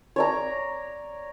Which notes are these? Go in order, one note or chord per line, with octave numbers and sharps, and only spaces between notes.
C#5 D5 A#5